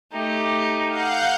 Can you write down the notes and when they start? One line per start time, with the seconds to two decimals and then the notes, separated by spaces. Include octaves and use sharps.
0.13 A3 D#4 G4
0.89 F5 F#5 G6